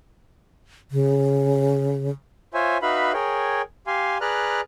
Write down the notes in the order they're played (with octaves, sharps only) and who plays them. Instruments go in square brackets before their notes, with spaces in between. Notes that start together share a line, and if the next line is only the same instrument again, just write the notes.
[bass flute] C#3
[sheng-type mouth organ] F4 C5 C#5 E5 G#5
D#4 F#4 B4 E5 F5 B5
G#4 A#4 C#5 G5
G4 F5 G#5 C6
G#4 B4 D5 A#5 F6 F#6